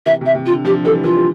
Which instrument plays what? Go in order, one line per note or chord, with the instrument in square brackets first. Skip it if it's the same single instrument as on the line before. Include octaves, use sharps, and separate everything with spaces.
[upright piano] C3 E3 [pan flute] E5
[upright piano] C3
[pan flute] E5
[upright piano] C3
[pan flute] F4
[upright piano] D3
[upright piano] D3 F3 [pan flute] G4
[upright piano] E3 G3 [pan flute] A4
[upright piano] E3 G3 [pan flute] F4
[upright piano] G3